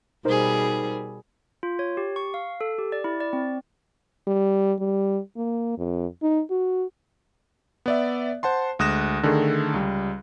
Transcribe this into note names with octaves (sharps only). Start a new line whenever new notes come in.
B2 G3 D#4 G#4 A#4 C5
F4
C#5
G4
C#6
F5
A4
G4
D5
E4
D5
C4
G3
G3
A#3
F2
D#4
F#4
B3 D5 E5
C5 F#5 A5 C6
D2 G#3 D#6 F#6 A#6 E7
D3 D#3 A3 G#4 A4
C#2 G3